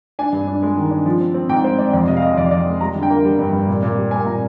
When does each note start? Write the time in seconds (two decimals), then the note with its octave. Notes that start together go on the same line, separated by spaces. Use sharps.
0.19 D4 G#5
0.33 G2
0.47 D4
0.63 G#3
0.77 D#3
0.91 D4
1.06 F3
1.20 C4
1.34 C4
1.49 G#2 G5
1.64 C4 C5
1.78 C4 D5
1.93 F2 D5
2.08 C3 D#5
2.17 F5
2.22 G#3 D#5
2.36 F2 D5
2.51 F2 D5
2.66 G#3
2.81 G3 A#5
2.95 D3
3.03 G5
3.10 A#3
3.24 G3
3.39 G2
3.53 G2
3.68 A#2
3.83 A#2
3.97 G3
4.11 A#3 G#5
4.26 A#2 A#5